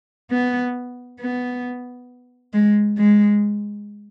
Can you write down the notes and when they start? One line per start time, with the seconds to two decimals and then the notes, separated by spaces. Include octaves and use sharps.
0.31 B3
1.20 B3
2.54 G#3
2.98 G#3